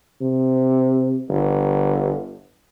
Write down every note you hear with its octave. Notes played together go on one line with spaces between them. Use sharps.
C3
G1